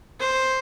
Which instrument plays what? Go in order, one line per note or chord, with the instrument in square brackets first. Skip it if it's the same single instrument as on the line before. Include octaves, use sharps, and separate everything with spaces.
[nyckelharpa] C5